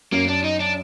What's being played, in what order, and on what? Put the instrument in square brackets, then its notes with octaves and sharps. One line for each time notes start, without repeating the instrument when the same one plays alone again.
[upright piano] F#2 [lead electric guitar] A#3
[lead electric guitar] D4
D#4
D4